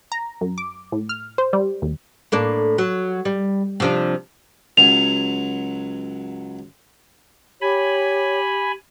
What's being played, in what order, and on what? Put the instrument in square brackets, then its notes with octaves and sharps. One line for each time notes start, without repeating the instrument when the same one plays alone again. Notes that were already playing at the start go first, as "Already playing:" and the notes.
[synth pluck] A#5
F#2
D6
A2
F6
C5
G3
D#2
[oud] A2 A#3 D4
F#3
G3
C3 F3 D4
[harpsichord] C#2 F#3 [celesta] F7
[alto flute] G4 [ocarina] C#5 [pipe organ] G#5 B5